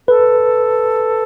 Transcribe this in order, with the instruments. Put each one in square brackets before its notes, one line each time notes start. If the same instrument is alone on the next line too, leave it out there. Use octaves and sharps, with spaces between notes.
[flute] A4 [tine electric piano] B4